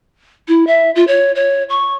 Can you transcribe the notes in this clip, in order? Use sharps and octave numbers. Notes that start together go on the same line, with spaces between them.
E4
E5
F4
C#5
C#5
C#6